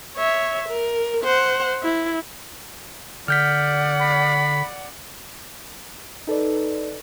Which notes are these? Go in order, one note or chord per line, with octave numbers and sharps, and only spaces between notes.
C#5 E5
A#4
C5 F#5
E4
D3 D5 F#5 F6 G6 B6
B5
D#4 A4 B4 D5